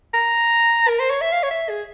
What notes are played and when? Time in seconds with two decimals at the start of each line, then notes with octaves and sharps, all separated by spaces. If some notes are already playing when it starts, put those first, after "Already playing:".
0.14 A#5
0.88 A#4
0.99 C5
1.10 C#5
1.21 E5
1.32 F5
1.43 C#5
1.51 E5
1.69 G#4